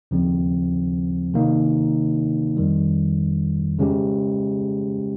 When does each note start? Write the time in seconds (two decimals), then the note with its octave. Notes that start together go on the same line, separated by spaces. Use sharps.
0.11 D#2 C#3 F3 C4
1.34 C3 D#3 A#3 D#4
2.57 F2 D#3 G3
3.79 C#3 G#3 C#4 G4